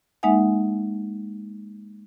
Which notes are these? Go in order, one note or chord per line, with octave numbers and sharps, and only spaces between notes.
G#3 A#3 D#4 E5 F#5 G#5